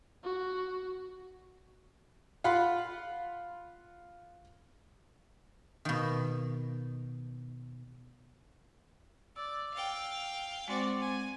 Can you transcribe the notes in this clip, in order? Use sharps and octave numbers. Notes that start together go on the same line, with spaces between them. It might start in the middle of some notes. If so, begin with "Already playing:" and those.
F#4
F4 F5 F#5 B5 C6
B2 D#3
D5 E6
F5 G5
G#3 C4 F#4 C5 D5
G#5